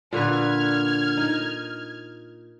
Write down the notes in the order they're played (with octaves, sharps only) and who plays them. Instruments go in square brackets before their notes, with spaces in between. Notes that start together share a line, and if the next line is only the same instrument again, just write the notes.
[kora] A#2 D3 B4 [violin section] F6 G#6
[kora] D#4